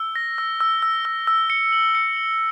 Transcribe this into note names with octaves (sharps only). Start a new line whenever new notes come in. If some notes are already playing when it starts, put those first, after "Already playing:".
Already playing: E6
A#6
E6
E6
E6
E6
E6
C#7
F#7
C#7
F#7